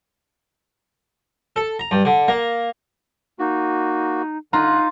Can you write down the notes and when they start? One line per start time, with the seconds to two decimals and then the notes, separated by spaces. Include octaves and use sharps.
1.56 A4
1.79 A#5
1.91 G2
2.05 D3
2.28 A#3
3.39 A#3 D#4 F#4
4.53 D3 D#4 F4 A#5 F#6